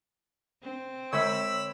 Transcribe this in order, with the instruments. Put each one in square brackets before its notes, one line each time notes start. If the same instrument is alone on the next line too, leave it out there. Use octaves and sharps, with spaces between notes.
[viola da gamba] C4
[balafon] D3 G#3 [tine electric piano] C#5 B6 [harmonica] B5 E6